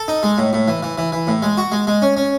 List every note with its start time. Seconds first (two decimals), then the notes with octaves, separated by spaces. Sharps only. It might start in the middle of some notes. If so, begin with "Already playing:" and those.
Already playing: A4
0.08 D#4
0.23 G#3
0.38 A2
0.53 A2
0.68 E3
0.83 E3
0.98 E3
1.12 E3
1.27 A2
1.42 G#3
1.57 F#4
1.72 G#3
1.87 G#3
2.02 C#4
2.17 C#4